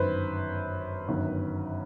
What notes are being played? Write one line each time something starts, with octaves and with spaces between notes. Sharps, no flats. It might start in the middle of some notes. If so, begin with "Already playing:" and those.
Already playing: G1 F#2 D#3 B4 C5
G1 F#2 D#3